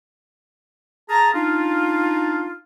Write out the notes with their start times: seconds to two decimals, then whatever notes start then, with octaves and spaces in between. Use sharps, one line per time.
1.10 G#4 A5 A#5
1.34 D4 D#4 F4